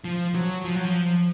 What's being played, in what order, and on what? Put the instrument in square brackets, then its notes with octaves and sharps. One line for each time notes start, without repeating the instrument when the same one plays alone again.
[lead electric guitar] F3
F#3
F3
F#3
F3